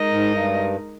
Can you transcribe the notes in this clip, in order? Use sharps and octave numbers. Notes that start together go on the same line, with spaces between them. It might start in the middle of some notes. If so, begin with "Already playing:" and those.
Already playing: G#3 D#4 A#4 D#5
G#2
G2